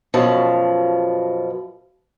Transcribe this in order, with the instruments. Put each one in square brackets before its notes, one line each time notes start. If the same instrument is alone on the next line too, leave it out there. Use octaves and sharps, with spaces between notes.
[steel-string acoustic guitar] F#2 B2 F3 A5